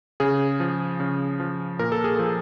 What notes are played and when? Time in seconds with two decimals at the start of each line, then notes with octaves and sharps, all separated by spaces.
0.20 C#3 G#4
0.60 F3
1.00 C#3
1.40 F3
1.79 A#2 A#4
1.92 A4
2.04 G#4
2.16 F3 A4